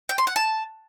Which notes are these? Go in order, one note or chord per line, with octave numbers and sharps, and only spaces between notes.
G5
C6
F#5
A5